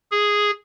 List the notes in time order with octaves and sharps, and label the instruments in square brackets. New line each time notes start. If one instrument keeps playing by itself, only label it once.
[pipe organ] G#4